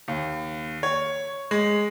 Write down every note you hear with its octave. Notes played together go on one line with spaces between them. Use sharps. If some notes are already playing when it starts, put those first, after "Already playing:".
D#2
C#5
G#3